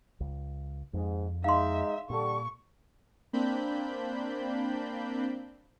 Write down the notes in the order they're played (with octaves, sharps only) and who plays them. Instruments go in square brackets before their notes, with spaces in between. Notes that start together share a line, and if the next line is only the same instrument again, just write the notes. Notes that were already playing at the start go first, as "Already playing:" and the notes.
[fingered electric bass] C#2
[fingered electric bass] F2 [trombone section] G#2
[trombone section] G#3 D#4 [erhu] E5 [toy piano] F5 C6
[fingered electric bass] A#2 [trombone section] D3 G3 A4 [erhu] C#6
[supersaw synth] A#3 C4 D4 B5 G6